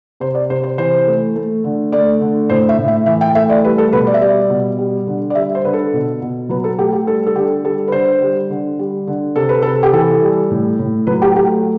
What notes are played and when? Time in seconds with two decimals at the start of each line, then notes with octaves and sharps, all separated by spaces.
0.20 C3 C5
0.35 D5
0.50 C3 C5
0.64 C5
0.78 E3 C5
1.07 A3
1.36 A3
1.64 D3
1.92 A3 D5
2.21 D3
2.50 A2 C5
2.69 E5
2.78 A2
2.88 E5
3.06 E3 E5
3.21 G5
3.35 A3 E5
3.50 D5
3.64 G3 B4
3.78 A4
3.92 B2 B4
4.07 D5
4.14 E5
4.21 G3 D5
4.50 B2
4.79 G3
5.07 D3
5.30 D5
5.35 G3 E5
5.55 C5
5.64 D3 B4
5.73 A4
5.93 B2
6.21 B2
6.49 F#3 B4
6.64 A4
6.79 A3 G4
6.93 G4
7.07 G3 A4
7.27 A4
7.36 D3 G4
7.64 G3 A4
7.88 B4
7.92 D3 C5
8.22 G3
8.50 D3
8.79 G3
9.07 D3
9.36 C3 A4
9.49 B4
9.62 C3 A4
9.83 G4
9.93 E3 A4
10.22 G3
10.51 A2
10.79 A2
11.07 F#3 B4
11.22 G4
11.36 A3 G4